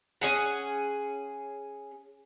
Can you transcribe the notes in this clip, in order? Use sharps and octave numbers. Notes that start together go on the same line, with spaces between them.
C#4 G#4 F#5